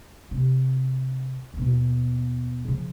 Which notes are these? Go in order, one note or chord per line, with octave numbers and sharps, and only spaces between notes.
C3
D#2 B2
C#3 F3